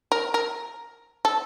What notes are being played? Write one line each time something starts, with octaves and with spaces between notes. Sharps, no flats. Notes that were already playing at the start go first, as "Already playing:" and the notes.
A#4
A#4
A4